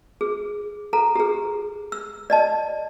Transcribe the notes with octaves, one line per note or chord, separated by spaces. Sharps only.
G#4
A4 A#5
G4 G#4
E6
D5 D#5 A5